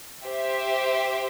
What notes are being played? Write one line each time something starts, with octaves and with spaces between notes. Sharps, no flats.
G4 C5 E5